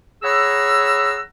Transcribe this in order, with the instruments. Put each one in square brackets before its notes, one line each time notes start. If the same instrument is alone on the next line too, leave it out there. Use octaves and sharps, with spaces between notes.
[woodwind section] G#4 C#5 F#5 A#5 B5 E6